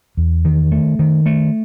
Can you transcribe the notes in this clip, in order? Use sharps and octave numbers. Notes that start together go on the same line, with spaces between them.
E2
D#3
A3
D#3
A3